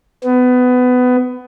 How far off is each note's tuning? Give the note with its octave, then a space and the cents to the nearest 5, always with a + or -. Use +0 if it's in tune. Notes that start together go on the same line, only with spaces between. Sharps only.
B3 +20